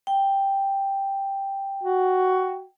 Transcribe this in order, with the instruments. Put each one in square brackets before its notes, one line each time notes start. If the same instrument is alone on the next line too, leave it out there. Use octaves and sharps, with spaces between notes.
[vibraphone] G5
[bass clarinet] F#4